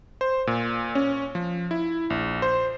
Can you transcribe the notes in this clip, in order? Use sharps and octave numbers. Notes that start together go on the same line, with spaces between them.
C5
A#2
C#4
F3
E4
A#1
C5